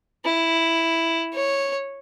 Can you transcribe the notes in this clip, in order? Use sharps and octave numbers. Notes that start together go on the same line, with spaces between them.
E4
C#5